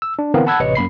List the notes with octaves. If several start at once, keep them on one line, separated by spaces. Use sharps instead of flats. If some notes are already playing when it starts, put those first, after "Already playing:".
E6
D4
D3 E3 B3 C4 A#4 F5
F#5 A5 B5 E6 F#6 G#6
A1 C3 B4 C#5 D#5 C#7
F#2 A#3 B5 C7